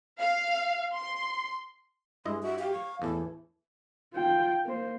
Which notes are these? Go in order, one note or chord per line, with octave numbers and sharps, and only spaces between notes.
F5
C6
G2 G#3 E4 D#5 C6
F#4 E5
G4 F5
C#6
E2 A2 E3 A5
F4 G5
A#3 C5